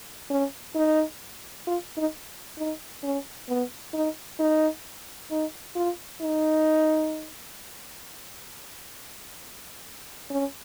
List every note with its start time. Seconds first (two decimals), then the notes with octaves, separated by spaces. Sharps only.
0.30 C#4
0.75 D#4
1.67 F4
1.97 D#4
2.58 D#4
3.03 C#4
3.49 B3
3.93 D#4
4.40 D#4
5.31 D#4
5.76 F4
6.21 D#4
10.30 C#4